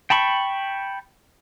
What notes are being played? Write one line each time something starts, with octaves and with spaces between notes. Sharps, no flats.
G5 A5 B5 C#6